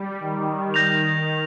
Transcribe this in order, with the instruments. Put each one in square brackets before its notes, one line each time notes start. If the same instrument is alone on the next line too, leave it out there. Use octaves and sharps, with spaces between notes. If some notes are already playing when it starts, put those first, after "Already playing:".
Already playing: [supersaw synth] G3
D#3
[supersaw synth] D#3 [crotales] G6 A#6 F7